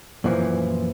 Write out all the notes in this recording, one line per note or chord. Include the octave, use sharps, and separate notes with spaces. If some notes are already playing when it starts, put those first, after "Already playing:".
F#2 A#2 E3 F3